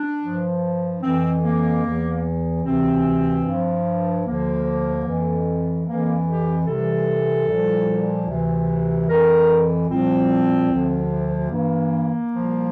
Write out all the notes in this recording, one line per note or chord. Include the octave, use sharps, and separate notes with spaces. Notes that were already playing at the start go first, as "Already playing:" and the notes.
Already playing: D4
G2 F3
F2 E3 C4
A#3
E2 E3
D2 C3 E3 C4
G2 F3
D2 D3 F3 A#3
F2 E3
F2 E3 A#3
G4
C2 C3 E3 A4
C2 A#2 F3
D2 C3 E3
F2 E3 A#4
C2 A#2 F3 C4
D2 D3 F3
G2 E3 A#3
C2 A#2 F3